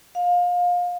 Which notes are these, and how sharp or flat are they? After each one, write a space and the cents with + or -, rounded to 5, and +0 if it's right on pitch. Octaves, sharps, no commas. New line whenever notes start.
F5 +25